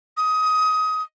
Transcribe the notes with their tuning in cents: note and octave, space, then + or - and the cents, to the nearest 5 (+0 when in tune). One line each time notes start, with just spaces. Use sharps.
D#6 +20